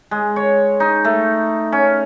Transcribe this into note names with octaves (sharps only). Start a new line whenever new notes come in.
G#3
C#5
D#4
A3
C#4